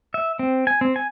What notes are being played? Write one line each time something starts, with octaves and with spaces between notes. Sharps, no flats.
E5
C4
G#5
C4
G#5